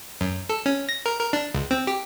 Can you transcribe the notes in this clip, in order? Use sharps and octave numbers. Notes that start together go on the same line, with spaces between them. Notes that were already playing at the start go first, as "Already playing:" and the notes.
F#2
A4
C#4
A#6
A#4
A#4
D4
C#2
C4
G4